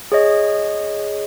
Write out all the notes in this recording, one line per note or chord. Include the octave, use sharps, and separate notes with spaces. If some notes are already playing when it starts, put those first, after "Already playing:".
G#4 C#5 D#5